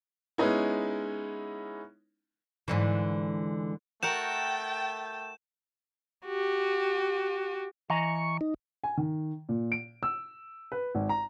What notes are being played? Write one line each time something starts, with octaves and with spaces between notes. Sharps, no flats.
G#3 B3 C#4 D#4 E4
G#2 D3 E3
A3 F#4 A#4 F#5 G5 G6 A6 E7
F#4 G4
E3 D#5 A#5 C#6
D#4
G#5
D#3
A#2
D7
E6
B4
G#1
A#5